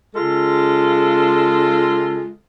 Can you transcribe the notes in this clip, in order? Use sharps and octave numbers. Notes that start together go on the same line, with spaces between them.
C#3 G#3 F4 A4